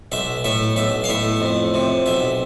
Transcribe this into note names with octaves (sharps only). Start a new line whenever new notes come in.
B1 E5
A2 E5
B1 E5
F5
A2 E5
F2
C3
B1 E5